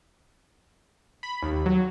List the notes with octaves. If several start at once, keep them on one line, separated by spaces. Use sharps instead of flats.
B5
D#2
F#3